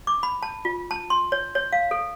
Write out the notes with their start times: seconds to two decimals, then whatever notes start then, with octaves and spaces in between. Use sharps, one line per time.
0.07 D6
0.23 B5
0.43 A5
0.65 F4
0.91 A5
1.10 C6
1.32 C#5
1.55 C#5
1.73 F5
1.91 A4